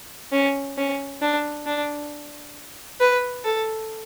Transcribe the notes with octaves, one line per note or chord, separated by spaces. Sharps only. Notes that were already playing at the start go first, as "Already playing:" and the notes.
C#4
C#4
D4
D4
B4
A4